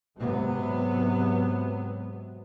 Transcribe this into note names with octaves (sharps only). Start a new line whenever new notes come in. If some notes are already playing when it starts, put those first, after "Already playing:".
G#2 C3 F#3 B3